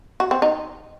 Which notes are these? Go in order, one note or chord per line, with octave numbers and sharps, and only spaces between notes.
F#4
C4
D#4